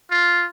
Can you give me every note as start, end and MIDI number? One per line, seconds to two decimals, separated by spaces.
0.10 0.46 65